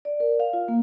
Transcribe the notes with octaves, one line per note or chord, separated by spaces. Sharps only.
D5
A#4
F5
F4
A#3